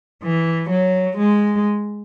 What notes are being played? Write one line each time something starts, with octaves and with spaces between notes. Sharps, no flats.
E3
F#3
G#3